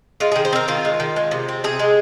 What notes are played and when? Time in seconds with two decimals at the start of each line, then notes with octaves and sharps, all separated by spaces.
0.20 G#3 F4
0.32 G#4
0.36 D#3
0.45 C5
0.53 C4 A#4
0.68 D#3 F4
0.85 G#3
1.00 D#3
1.16 G#3
1.31 C3
1.49 C4
1.64 C3 G#4
1.79 G#3